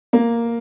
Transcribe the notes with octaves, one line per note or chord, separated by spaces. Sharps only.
A#3